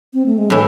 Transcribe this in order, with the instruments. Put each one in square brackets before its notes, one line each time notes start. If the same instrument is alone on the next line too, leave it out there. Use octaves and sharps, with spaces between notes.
[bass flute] C4
A3
G#3
[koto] A2 E3 [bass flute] F#3